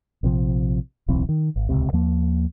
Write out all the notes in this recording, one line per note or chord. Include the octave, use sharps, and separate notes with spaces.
A#1 C3 F3
D1 B1 E3 C4
D#3
G#1
D#1 G#1 C#2 C3
D#2 F3 A#3